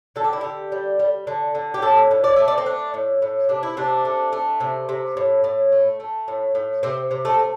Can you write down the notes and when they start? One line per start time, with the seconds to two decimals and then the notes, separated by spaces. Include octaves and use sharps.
0.16 D3 A4
0.24 G4
0.33 E4
0.41 D3 G4
0.72 G3
0.99 G3
1.27 D3
1.55 D3
1.74 G4
1.82 A2 A4
2.11 A2
2.24 D5
2.36 A3 E5
2.48 D5
2.58 C4
2.66 A3 D4
2.94 A2
3.22 A2
3.49 C3 D4
3.63 E4
3.77 C3 D4
4.05 A3
4.33 A3
4.60 C3
4.89 C3
5.17 A2
5.44 A2
5.72 A3
6.00 A3
6.28 A2
6.55 A2
6.83 C3 C4
7.11 C3
7.25 A3
7.39 A3